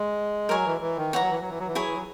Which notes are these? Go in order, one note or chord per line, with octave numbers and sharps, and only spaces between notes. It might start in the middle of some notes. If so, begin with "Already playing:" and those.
Already playing: G#3
F#3 A#4 C#5 G#5
E3
E3
D#3
E3 C#5 F#5 A#5
F#3
E3
F#3
E3
F#3
E3
F#3 E4 G#4 C#5
E3
F#3